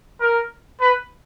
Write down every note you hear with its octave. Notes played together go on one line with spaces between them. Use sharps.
A#4
B4